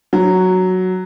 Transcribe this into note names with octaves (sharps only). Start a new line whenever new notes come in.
F#3